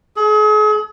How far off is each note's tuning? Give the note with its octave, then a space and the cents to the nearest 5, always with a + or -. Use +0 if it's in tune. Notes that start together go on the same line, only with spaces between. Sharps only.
G#4 +40